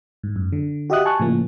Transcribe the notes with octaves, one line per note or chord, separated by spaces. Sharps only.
G#2
F#2
D3
F#4 G4 D#5 E5 D#6 F#6
G#5 A5 C#6 F#6
A2 C#3 F3 A#3